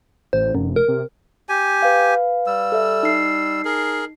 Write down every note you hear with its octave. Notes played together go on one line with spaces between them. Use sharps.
A1 C5
F1 F#2
A#4
C3
G4 G#5
B4 F5
G3 E6
A4 E5
D#4 C7
G#4 A#4